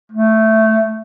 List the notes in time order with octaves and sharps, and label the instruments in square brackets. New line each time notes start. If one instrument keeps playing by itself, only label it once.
[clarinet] A3